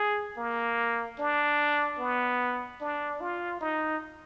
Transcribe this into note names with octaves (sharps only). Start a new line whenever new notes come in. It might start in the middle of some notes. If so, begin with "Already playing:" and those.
Already playing: G#4
A#3
D4
B3
D4
F4
D#4